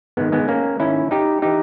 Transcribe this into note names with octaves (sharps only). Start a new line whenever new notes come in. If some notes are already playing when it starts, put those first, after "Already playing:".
G#2 D#3 G#3 B3
G#3 B3
A#3 C#4
G#2 D#3 C#4 E4
D#4 G4
E3 D#4 G4